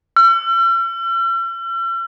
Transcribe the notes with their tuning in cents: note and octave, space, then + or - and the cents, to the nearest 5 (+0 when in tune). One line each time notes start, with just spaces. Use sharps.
E6 +45